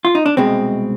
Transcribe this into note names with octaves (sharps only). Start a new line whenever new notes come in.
F4
D#4
D4
C2 B2 G#3 C4